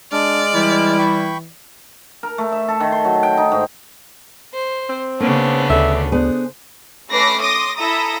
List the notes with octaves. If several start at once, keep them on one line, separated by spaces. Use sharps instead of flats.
G#3 D4 D5 F6
E3 G3 E4
G5 B5 C#6
A#4
A3
E5
A4
D#3
C6
F#3
G5
D#4
G#2
C5
C4
C#3 A#3 B3 D4
D2 D3 E5
B3 D4 G#4 C5
A3 C#4 B4 D6 A#6 C7
C6 D6 D#6 A#6
E4 A4 E5 A#5 D#6 A#6